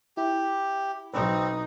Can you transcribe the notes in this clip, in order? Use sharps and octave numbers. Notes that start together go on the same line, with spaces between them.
E4 G4
B1 C4 D#4 B4